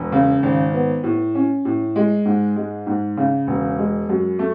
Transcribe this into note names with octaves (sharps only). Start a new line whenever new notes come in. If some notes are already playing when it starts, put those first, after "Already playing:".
Already playing: E1
C#3
G#1
B3
A2
C#4
A2
G#3
G#2
G#3
G#2
C#3
E1
G#3
F#2
A3